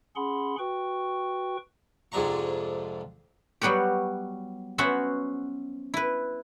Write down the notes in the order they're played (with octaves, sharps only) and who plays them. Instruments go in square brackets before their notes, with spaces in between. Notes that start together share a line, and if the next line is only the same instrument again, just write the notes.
[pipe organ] C#4 G#4 F#5 B5 C6
F#4 B4 G5 C#6
[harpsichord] F2 G#2 C3 D4 A#5 C#6
[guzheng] F#3 G3 B3 F#4 G4
B3 C#4 F#4 C5 E5 F#5
E4 B4